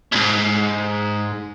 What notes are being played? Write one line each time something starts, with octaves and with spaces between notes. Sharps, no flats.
D2 G#2